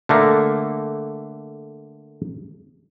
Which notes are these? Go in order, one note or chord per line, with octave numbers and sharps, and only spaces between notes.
D3 A3 A#3